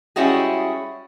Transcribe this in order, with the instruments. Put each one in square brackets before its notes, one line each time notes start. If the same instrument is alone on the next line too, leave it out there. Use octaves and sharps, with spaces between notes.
[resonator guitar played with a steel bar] G3 G#3 C#4 E4 F#4 G#4